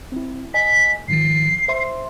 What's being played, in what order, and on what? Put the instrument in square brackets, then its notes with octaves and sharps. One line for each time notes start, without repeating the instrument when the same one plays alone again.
[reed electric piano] C4 E4
[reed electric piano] D#5 G#5 [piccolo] B6
[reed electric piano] G#2 D#3 F3 [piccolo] C7
[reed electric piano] C5 E5 C6